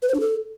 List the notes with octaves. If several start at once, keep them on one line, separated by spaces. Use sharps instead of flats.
B4
C5
D4
A4